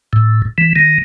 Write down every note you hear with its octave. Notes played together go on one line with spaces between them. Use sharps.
A2
E3
D#3